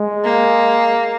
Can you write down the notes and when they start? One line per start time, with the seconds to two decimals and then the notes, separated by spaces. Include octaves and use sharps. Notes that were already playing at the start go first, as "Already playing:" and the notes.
Already playing: G#3
0.24 A#3